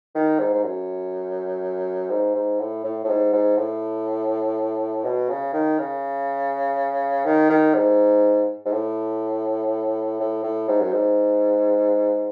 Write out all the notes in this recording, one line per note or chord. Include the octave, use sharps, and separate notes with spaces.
D#3
G#2
G#2
F#2
G#2
G#2
A2
A2
A2
G#2
G#2
A2
B2
C#3
D#3
C#3
D#3
D#3
G#2
G#2
A2
A2
A2
G#2
F#2
G#2